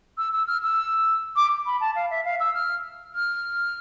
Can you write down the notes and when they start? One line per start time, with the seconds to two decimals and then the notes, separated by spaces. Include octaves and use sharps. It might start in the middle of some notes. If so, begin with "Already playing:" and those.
0.18 E6
0.33 E6
0.47 F6
0.63 E6
1.36 D6
1.66 B5
1.80 A5
1.95 F5
2.10 E5
2.25 F5
2.40 E6
2.54 F6
3.14 F6